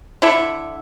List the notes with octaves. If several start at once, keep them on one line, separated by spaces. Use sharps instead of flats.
D3 E4 A4 E5